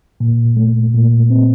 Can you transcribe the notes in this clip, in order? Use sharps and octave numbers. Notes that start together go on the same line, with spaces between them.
A#2
A3
A#2
C4